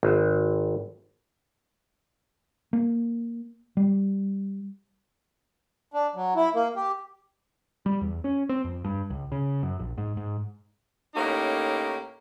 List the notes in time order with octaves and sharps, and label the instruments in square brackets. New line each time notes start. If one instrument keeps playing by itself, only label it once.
[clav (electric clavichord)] G#1
[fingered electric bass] A#3
G3
[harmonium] D4
F#3
E4
A#3
G4
[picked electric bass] G3
E2
C#4
C4
F2
G2
C#2
C#3
F#2
A#1
G#2
G#2
[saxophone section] A2 A#3 C#4 D#4 G4